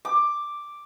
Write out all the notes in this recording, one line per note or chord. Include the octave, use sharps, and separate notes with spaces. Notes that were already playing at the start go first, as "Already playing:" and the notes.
D6